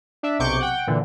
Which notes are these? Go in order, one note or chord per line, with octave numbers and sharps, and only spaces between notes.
D4 E5
B1 C3 C#6 D6 G6
F#5 G5
A#2 D3 E3